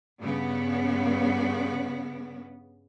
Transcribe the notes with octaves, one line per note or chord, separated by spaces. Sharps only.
G2 C#3 B3